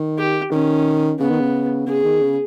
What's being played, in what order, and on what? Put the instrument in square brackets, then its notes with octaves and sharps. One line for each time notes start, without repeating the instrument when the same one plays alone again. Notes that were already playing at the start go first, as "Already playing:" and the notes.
Already playing: [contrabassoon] D#3
[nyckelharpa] G4
[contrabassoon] D#3 [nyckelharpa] C#4
[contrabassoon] C#3 [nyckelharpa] B3
[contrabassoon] D#3
C#3
[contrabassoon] C#3 [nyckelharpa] G#4
[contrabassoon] D#3
C#3